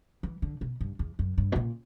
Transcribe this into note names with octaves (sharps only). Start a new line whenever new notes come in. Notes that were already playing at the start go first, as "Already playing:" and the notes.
E3
D3
B2
G2
E2
F#2
G2
B2
A#2